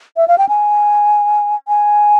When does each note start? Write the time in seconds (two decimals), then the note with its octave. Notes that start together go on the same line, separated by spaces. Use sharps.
0.17 E5
0.28 F5
0.38 G5
0.49 G#5
1.68 G#5